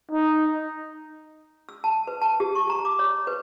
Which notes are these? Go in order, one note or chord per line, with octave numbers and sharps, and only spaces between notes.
D#4
E6
A5
B4
A5
G4
C#6
A#5
D6
C#5
B4